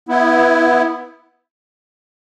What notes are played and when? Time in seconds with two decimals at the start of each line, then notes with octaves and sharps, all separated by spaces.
0.09 B3 E4